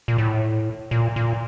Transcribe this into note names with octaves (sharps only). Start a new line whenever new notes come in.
A#2
A2
A#2
A#2